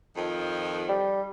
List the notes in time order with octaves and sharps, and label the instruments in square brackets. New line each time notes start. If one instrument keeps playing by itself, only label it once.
[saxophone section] F2 D#3 F3
[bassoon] G3